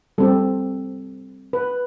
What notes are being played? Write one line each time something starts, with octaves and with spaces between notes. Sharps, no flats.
G3 C4 G4 A4
B4